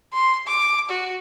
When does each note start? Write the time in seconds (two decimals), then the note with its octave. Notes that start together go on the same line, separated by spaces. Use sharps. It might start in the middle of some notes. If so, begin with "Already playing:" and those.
0.13 C6
0.47 D6
0.89 F#4